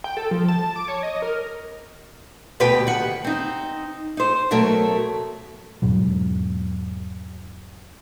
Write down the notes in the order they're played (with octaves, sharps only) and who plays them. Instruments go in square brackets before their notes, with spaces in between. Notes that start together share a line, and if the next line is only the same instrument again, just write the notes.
[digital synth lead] G5
A4
F3
A5
D6
C#5
D#5
A#4
[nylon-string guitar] D2 B2 G4 B4 G5
D#3 F#5
C4 D#4
D#4 C5
B2 F#3 A3 A#4
[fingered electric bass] E2 G#2 B2 F#3